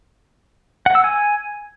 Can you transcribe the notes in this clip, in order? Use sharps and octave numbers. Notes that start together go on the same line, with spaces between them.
F#5
E6
G#5